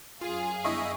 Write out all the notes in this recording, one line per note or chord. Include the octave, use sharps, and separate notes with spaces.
F#2 F4 G#4 F5
G1 E4 D#5 E5 C#6 D#6